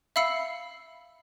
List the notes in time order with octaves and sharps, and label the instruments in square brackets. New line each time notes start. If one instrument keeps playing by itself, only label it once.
[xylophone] E5 F5 B5 E6 C7 C#7